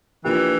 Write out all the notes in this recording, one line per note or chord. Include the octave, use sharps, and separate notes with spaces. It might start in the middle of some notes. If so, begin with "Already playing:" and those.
E3 F3 A#3 D4 G4